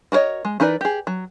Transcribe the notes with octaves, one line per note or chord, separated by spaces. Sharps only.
F#4 A#4 B4 C#5 D#5
G#3
E3 D#4 A#4 B4 D5
G4 G#4
F#3